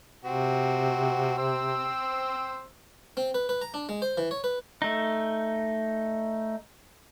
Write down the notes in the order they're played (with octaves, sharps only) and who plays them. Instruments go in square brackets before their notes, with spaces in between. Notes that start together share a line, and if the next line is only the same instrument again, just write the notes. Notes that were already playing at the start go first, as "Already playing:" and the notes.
[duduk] C3 [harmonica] C4 F#4
[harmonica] C4 C5 E6
[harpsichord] C4
B4
B4
A#5
D4
G#3
C5
E3
C#5
B4
[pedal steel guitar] A3 D#4